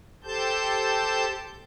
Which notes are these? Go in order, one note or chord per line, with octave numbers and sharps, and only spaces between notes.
G4 A4 C5 A5 G6